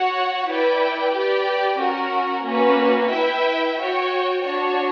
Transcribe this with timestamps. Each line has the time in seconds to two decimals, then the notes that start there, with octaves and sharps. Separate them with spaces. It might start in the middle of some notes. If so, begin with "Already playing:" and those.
Already playing: F#4 C#5 F#5
0.48 E4 B4 D5 G5
1.14 G4 B4 D5 G5
1.79 C#4 F#4 A#4
2.45 A#3 C#4 F#4 B4
3.11 E4 B4 E5 G5
3.76 F#4 C#5 G5
4.42 D4 F#4 C#5